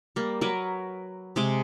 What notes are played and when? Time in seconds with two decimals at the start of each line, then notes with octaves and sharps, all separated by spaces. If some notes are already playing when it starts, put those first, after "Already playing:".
0.16 G3 A#3
0.41 F#3 A#4 B4
1.36 C3 G#3 D6